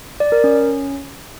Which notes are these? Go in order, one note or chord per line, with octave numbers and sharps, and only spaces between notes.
D5
A#4
C#4